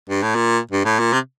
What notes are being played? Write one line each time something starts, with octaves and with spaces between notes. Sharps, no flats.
G2
A2
A#2
G2
A2
A#2
C3